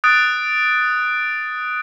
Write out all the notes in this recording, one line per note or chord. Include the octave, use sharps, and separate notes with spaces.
D#6 F#6 A6 D7